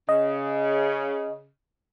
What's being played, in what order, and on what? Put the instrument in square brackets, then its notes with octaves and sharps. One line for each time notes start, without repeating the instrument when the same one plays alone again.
[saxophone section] C#3 [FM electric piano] D#5